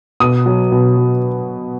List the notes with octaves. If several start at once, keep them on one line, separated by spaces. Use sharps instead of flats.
B2 D#6
F#3
B2
F#3